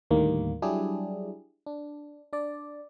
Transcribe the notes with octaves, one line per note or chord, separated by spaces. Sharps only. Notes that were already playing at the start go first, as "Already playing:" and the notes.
D#2 A2 D3 D#3 G3 A#3
F#3 G3 D4 E4 G4 G#4
D4
D4 D5